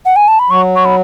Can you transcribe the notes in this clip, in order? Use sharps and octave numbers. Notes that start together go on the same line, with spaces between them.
F#5
G#5
A5
B5
F#3 C#6
C#6
B5